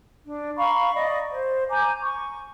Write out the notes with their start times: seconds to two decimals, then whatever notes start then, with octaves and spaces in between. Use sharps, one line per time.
0.25 D4
0.57 F5 A#5 B5 C#6
0.94 D5 D#5
1.32 C5
1.70 G#5 A#5 D6 G6
2.03 C#6